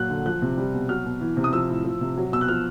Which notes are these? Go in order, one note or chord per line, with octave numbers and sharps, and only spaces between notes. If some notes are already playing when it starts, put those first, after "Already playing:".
Already playing: A#2 F#3 F#6
D3
F3 F#6
C3
G3
B2
F#3 F6
B2
E3
C3
D#6
F3 E6
A2
F3
C3
F#3
B2 E6
F#6
F3 F6